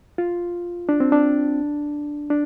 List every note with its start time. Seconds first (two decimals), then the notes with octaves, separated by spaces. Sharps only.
0.18 F4
0.89 D4
1.00 C4
1.12 D4
2.30 D4